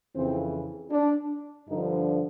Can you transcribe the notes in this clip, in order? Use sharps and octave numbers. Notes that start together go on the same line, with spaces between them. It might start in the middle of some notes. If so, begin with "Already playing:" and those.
F2 C#3 E3 C4
D4
G2 D3 F3 D#4